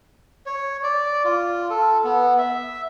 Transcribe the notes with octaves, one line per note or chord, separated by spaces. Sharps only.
C#5
D5
F4
A4
B3
E5